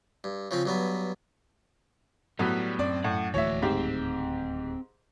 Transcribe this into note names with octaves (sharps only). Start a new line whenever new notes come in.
G2
C#3 F3 C4
G2 F#3 B3
A2 F#3 G3 B3
F#2 C4 D5
A2 F#5
D1 D#2 E3 A3 F#4 C#5 E5
G#2 C4 G4